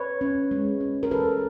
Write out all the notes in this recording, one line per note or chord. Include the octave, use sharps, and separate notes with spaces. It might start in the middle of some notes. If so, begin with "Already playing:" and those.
Already playing: B4 C#5
C#4
G#3
C#4
A#4
E3 A4 B4